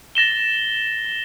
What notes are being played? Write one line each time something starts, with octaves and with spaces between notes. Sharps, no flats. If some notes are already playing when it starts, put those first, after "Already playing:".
A6 A#6 E7 G7